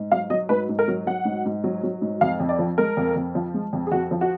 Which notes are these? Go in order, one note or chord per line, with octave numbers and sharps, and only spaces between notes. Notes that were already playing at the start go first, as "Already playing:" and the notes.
Already playing: G#2
F#3 F5
F#3 D#5
G#2 B4
G#2
A#4
F#3
F#3 F#5
G#2
G#2
F#3
F#3
G#2
F2 F5
F2
D5
F3
G#3 A#4
F2
F2
F3
G#3
F2
G#4
F2 F#4
F3
F#4